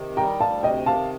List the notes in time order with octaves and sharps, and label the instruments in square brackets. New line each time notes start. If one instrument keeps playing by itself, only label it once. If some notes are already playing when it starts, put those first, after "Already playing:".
Already playing: [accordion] C3 D#3
[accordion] G3 [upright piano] G5 A#5
[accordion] D2 [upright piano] F5 A5
[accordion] C3 [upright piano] D#5 G5
[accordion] D#3 [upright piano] F5 A5